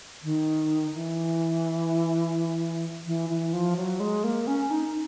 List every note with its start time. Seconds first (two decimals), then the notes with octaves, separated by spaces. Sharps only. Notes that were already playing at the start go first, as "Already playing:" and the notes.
0.23 D#3
0.94 E3
3.06 E3
3.30 E3
3.53 F3
3.77 F#3
4.00 G#3
4.24 A#3
4.47 C#4
4.71 D#4